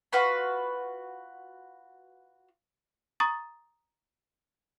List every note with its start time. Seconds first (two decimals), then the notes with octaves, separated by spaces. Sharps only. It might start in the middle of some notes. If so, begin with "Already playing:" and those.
0.13 F4 F#4 B4 B5
3.20 A#5 C#6 D#6 A6